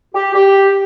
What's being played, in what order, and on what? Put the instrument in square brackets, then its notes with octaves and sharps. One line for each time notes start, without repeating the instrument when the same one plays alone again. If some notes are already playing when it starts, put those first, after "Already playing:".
[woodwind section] G4
G4